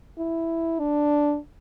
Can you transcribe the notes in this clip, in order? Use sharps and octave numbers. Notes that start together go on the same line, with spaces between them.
E4
D4